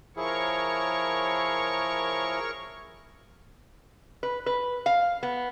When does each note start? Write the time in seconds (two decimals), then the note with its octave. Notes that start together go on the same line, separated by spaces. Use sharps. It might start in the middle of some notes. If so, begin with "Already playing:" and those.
0.17 F3 E4 G#4 A#4 C#5 C#6
4.23 B4
4.46 B4
4.86 F5
5.23 B3